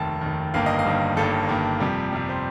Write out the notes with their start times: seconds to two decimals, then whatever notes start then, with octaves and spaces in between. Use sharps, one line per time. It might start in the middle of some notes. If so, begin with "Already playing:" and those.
Already playing: F1 D#2 D#3 A5
0.21 F1 D#2 D#3
0.54 G1 G2 D#3 A#3 F5
0.66 D#5
0.79 F5
0.85 G1 G2 D#3 A#3
1.17 G1 G2 D#3 A#3 A4
1.49 G1 G2 D#3 A#3
1.80 F2 C3 G3
2.13 F2 C3 G3
2.29 C5